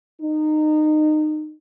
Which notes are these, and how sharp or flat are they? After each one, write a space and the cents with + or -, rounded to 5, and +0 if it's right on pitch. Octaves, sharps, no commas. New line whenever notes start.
D#4 -25